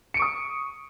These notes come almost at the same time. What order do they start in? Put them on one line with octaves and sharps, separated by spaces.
C#7 D7 C#6 D#6